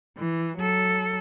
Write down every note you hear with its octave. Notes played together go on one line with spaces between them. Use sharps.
E3
F#3 A4